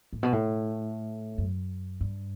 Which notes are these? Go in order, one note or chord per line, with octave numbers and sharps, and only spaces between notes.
A2
B2
A2
F#2
G2